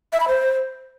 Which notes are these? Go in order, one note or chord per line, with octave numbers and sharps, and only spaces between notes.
E5
B5
C5